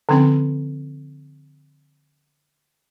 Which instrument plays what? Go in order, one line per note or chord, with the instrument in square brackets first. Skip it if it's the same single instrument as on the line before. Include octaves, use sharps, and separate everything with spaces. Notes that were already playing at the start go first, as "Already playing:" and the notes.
[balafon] D3 F3 C4 C#4 B5